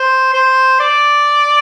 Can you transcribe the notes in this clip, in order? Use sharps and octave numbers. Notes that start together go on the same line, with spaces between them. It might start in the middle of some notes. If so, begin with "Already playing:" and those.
Already playing: C5
C5
D5